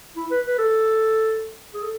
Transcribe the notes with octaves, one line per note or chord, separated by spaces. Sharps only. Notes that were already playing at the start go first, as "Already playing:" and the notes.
E4
B4
B4
A4
G#4
A4